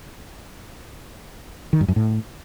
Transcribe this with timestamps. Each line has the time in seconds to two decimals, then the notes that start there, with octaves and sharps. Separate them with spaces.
1.73 D#3
1.81 G2
1.88 F#2
1.96 A2